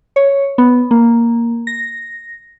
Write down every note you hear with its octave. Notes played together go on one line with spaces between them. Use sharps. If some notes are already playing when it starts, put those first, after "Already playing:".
C#5
B3
A#3
A#6